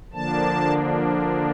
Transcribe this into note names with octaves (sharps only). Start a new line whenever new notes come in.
D3 F3 A#3 D4 A5